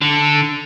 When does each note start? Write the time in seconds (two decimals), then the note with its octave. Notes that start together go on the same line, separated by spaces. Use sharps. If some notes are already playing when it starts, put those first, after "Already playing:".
0.02 D3